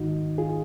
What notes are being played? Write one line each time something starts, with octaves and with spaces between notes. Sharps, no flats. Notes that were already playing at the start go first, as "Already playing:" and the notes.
Already playing: G#2 D#3 D#4 F#4
F4 G#4